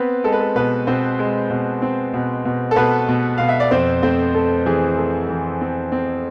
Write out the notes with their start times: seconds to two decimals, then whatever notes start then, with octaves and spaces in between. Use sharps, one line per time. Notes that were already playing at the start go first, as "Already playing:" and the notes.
Already playing: B3 C4 B4
0.24 G#3 A4
0.32 B4
0.40 A4
0.56 B2 B3 B4
0.87 B2 C4 C5
1.19 G#3
1.50 B2
1.82 C4
2.14 B2
2.45 B2
2.71 A4
2.76 B2 B3 B4
3.08 B2
3.38 B2 F5
3.49 E5
3.60 D5
3.71 F2 C4 C5
4.03 A3 C4 C5
4.34 A3 A4
4.66 E3 G#4
4.98 A3
5.29 E3
5.61 C4
5.92 C4